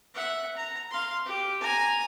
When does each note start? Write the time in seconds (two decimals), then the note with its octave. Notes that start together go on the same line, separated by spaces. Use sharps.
0.14 E5 F#5
0.56 A#5
0.91 F5 C6
1.26 G4
1.61 G#5 A#5